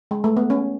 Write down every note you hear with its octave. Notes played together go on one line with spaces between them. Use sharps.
G#3
A3
B3
C#4